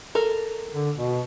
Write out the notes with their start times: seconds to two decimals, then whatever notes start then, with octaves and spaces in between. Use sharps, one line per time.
0.15 A4 A#4
0.74 D3
0.98 B2